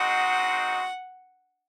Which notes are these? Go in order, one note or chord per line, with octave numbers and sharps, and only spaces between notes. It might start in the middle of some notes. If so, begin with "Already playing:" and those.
Already playing: G#3 C4 D#4 F#4 F#5